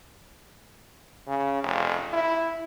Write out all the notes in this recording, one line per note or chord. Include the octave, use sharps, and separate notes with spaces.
C#3
F1
E4